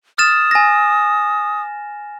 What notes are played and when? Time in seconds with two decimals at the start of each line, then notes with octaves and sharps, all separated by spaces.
0.18 D#6 F6 A6 E7
0.51 G#5 A#6